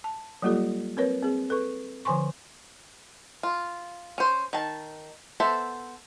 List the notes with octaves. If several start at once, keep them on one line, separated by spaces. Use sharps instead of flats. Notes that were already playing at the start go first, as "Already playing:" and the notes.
A5
F#3 G3 A#3 F4 G4 A4
C4 A#4 B4 C#5
C4 G#4
A4 B4 C#6
D3 F3 C5 G#5 C6 C#6
F4
C#4 C5
D#3 A5
B3 A4 C5 E5